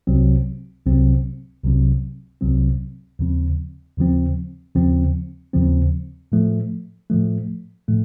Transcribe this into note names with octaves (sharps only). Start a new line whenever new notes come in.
C2 C3 F#3 C4
C2 C3 F#3 C4
C2 C3 F#3 C4
C2 C3 F#3 C4
D#2 C#3 F3 C4
D#2 C#3 F3 C4
D#2 C#3 F3 C4
D#2 C#3 F3 C4
A2 F3 A3
A2 F3 A3
A2 F3 A3